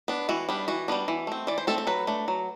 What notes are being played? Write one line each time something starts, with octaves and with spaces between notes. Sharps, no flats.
B3 D4
E3 F#4
G3 B3 D4
E3 F#4
G3 B3 D4
E3
A3 C4
E3 D5
C5
A3 C4 A4
A4
F#3 B4
A3 D4
F#3